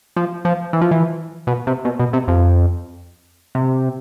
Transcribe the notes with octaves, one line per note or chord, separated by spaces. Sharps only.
F3
F3
E3
F3
E3
B2
C3
B2
B2
C3
F2
C3